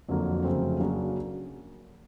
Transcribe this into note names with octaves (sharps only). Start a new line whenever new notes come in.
F2 D3 F#3 A#3
F2 C#3 F#3 A3 C4
C#3 F#3 A#3 D4